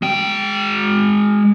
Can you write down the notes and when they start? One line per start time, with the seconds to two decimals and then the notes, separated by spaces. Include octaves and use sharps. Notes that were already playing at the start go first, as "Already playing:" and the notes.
0.02 G#3 G5